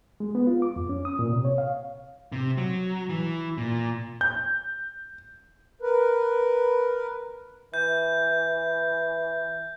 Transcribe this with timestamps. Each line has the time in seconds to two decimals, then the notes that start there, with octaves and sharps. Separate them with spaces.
0.20 G#3
0.35 B3
0.47 F4
0.62 D6
0.76 F2
0.89 C#4
1.05 D#6
1.19 A#2
1.32 C3
1.45 C#5
1.58 F5
2.32 C3
2.57 F#3
3.09 E3
3.58 A#2
4.21 G6
5.81 A#4 B4
7.74 E3 G6